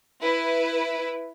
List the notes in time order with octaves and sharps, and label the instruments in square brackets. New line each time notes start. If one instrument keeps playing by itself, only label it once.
[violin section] E4 B4